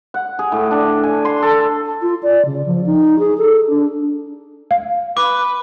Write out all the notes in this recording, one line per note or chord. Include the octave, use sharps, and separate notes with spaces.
F#5
G#4
A2
D4
G#5
C6
A4
F4
D5
C#3
F3
D#4
G#4
A4
D4
F5
B4 D6